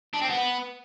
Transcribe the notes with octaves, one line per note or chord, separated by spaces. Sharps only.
D4
C4
B3